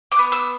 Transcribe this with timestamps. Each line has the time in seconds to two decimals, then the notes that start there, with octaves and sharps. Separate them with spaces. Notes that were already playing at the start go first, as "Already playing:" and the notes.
0.12 D6
0.19 B3
0.32 E6